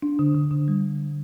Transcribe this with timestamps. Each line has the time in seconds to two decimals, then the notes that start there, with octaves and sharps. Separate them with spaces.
0.02 D4
0.19 D3
0.35 D3
0.51 D3
0.68 G3